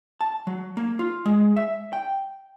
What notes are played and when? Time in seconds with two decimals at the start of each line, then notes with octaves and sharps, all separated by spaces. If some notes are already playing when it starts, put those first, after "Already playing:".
0.21 A5
0.47 F#3
0.77 A#3
0.99 F4
1.26 G#3
1.56 E5
1.93 G5